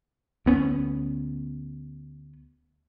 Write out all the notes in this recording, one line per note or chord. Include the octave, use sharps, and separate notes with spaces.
D2 B3 C#4